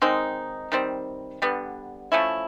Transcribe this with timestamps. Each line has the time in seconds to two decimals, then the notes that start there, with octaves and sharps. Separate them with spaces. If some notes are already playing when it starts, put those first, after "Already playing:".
0.02 D#3 G#3 C4 D#4
0.72 D#3 G3 C4
1.42 D3 G3 B3
2.12 F3 A3 C#4 E4